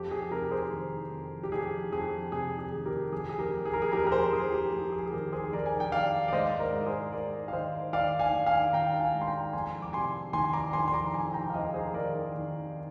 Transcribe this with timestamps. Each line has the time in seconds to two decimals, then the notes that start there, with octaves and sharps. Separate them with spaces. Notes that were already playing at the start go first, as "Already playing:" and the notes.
Already playing: F2 G4
0.11 G#4
0.31 C3 G4 A#4
0.52 G#4 C5
0.72 D#3
1.12 F2
1.43 G4
1.52 F2 G#4
1.92 F2 G#4
2.32 C3 G#4
2.59 G#4
2.72 D#3
2.85 G4 A#4
3.12 F2 G#4
3.29 G#4
3.38 G4 A#4
3.53 F2
3.66 G#4
3.73 A#4
3.82 G#4
3.92 F2 G4 A#4
4.06 A#4
4.12 G#4 C5
4.32 F2 G#4
4.52 G4
4.72 F2 G4
4.92 G#4
5.06 G#4
5.12 D#3 G4 A#4
5.32 G#4 C5
5.52 F2 A#4 D5
5.66 G#5
5.80 G5
5.92 D#3 D5 F5
6.28 D5
6.33 G#2 C5 D#5
6.59 A#4 D5
6.72 G#2
6.86 G#4 C5
7.12 G#2 A#4 D5
7.48 F5
7.53 D#3 C5 D#5
7.93 D#3 D5 F5
8.19 F5 G#5
8.33 D#3
8.46 F5 G#5
8.73 D#3 G5 A#5
9.00 F5 G#5
9.14 G#2
9.21 C6
9.27 G5 A#5
9.53 F2 G#5 C6
9.82 D6
9.93 C3 G#5 C6
10.33 D#3 G#5 C6
10.53 A#5 D6
10.73 F2 G#5 C6
10.88 C6
10.93 A#5 D6
11.13 F2 G#5 C6
11.33 G5 A#5
11.50 F5
11.54 F2 C5 D#5
11.74 G#4 C5
11.94 D#3 A#4 D5
12.35 D#3